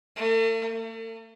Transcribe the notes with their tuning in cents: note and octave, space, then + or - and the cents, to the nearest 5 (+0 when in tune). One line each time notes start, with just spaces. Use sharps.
A3 +45
A3 +45